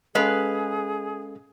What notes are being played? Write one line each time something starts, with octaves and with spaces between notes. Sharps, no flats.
G#3 C#4 G#4 A4 B4 D#5 F5